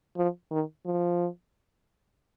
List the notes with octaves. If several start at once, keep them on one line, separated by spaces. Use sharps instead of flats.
F3
D#3
F3